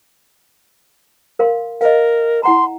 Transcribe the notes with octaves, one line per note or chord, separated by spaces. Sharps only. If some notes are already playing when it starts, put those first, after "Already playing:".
A#4 F5 C6
A#4 D#5 F5
E4 F#5 A#5 C6